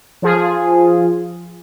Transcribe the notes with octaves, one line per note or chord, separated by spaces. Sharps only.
F3 F4 G#4